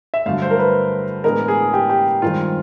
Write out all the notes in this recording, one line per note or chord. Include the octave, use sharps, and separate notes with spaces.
E5
G2 D3 F#3 A3 F5
C5
A#4
B4
A2 E3 G#3 B3 D4 A#4
G#4
G4
G4
G2 D#3 G#3 C4 F4